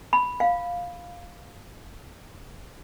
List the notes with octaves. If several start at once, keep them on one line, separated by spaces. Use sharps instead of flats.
B5
F5